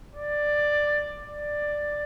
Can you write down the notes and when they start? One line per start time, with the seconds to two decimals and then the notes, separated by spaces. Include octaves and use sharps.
0.15 D5
1.26 D5